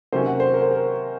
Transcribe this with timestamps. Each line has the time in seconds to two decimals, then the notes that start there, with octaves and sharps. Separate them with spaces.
0.12 C3 D#3 F#3 A#3 C#4 C5
0.26 F#5
0.40 C5
0.53 A#4
0.62 C5
0.71 A#4